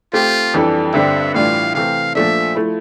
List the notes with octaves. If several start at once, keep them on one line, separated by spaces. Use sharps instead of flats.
A3 C4 F4 G4
F2 E3 G3 D4 A4
G2 D3 G3 C4 G4 E5
A2 E3 G3 D4 F4 F5
C3 E3 A3 C4 F5
A#2 F3 A3 D4 E5
F3 A3 E4